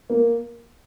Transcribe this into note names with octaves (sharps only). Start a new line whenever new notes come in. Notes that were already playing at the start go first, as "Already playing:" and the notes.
A#3